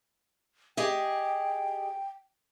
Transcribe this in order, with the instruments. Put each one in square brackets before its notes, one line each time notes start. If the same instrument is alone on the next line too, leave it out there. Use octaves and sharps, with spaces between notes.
[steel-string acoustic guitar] G4 G#4 D#5 [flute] G5